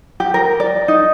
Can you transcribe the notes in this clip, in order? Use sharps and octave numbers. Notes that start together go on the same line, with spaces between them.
G4
A#4
D5
D#4